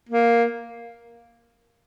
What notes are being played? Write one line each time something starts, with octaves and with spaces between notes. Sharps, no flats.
A#3